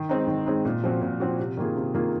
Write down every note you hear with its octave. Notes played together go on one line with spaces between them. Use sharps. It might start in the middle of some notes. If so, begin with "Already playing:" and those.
Already playing: D#3
G#3 C4 D#4
D#3
G#3 C4 D#4
A#2
F3 C4 F#4
A#2
F3 C4 F#4
C3
D#3 A#3 F4 G#4
C3
D#3 A#3 F4 G#4